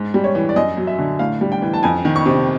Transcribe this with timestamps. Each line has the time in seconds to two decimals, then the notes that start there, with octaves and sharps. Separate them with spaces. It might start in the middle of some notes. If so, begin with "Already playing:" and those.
Already playing: G#2
0.14 G3
0.24 C#5
0.35 E3
0.49 D5
0.56 F#2 D#5
0.77 F#3
0.87 E5
0.99 D3
1.19 A2 F5
1.41 G3
1.52 G5
1.62 E3
1.74 A5
1.83 F2 G#5
2.05 D#3
2.16 C#6
2.26 C3